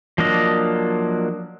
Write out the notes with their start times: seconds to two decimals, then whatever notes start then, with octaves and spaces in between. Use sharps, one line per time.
0.18 F3 F#3 A#3 D4 D#5